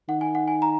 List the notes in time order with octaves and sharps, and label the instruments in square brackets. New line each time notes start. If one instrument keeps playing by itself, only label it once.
[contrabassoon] D#3 [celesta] F#5
[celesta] G#5
F#5
G#5
A#5